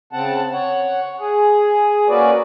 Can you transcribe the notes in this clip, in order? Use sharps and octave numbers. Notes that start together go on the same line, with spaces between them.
C#3 C4 F#5 A5
C#5 F#5
G#4
A#3 C#4 F#4 B4 D5